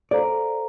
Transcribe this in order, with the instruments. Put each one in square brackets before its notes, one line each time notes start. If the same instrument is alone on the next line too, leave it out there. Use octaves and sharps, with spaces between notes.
[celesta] A4 C5 F5 A#5 [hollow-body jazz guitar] D5